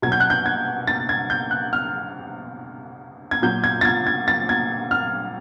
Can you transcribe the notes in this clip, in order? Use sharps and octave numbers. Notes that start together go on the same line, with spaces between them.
B2 F#3 G#6
G6
F#6
G6
G#6
A6
G#6
G6
F#6
F6
G#6
A#2 F#3 G6
G#6
A6
G#6
G#6
A6
G#6
F6